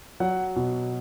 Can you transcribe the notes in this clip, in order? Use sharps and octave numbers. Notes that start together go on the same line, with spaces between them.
F#3 F#5
B2